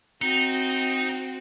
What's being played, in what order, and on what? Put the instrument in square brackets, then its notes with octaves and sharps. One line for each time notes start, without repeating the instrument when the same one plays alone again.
[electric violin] C4 F#4 [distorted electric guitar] D#4